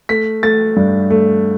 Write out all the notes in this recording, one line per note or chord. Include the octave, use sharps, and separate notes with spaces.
A3 B6
A3 A6
G2
A3